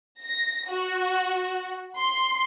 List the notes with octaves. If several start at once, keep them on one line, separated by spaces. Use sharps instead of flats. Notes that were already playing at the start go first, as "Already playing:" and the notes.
A#6
F#4
C6